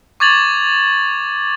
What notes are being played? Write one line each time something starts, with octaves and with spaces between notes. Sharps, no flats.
C#6 D6 G#6 A6 F7 F#7